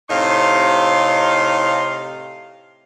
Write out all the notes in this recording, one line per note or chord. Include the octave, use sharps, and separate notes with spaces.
A2 C3 D#4 F5 C6